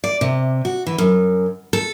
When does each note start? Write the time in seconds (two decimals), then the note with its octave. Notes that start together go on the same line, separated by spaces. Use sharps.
0.04 D5
0.21 C3
0.65 F#4
0.87 E3
0.98 F#2
1.73 A4